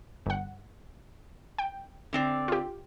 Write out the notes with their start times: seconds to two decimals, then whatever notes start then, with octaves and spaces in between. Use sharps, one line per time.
0.26 G1 F#5
1.58 G5
2.13 D3 C4 D5
2.48 F4 G4